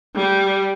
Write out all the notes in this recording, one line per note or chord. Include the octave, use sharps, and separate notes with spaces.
G3